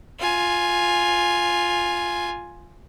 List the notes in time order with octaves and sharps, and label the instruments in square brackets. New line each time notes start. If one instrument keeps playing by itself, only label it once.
[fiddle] F4 G#5